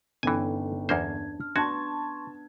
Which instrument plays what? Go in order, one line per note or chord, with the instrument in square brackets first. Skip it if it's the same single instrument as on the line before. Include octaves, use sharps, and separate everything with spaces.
[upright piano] G1 [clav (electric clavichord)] E3 G#5 [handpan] C#4 [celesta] D#4 A4 G5
[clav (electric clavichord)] E2 A#3 C5 [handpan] D4 [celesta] G#6
[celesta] F6
[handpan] B3 D4 [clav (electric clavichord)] F#4 [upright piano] A5 G#6 [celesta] C6 C#6